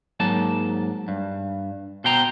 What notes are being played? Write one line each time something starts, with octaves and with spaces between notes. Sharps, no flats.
G#2 F#3 A#3 A5
G2
B2 C5 G5 A#5